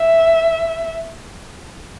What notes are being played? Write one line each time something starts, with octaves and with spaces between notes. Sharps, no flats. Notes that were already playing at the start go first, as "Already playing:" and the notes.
Already playing: E5